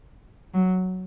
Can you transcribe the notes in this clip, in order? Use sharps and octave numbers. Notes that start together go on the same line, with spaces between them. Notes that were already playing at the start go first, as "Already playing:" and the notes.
F#3